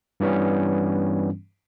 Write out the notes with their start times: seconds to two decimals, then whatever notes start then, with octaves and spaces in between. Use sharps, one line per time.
0.20 G2 E3 G3 B3 C#4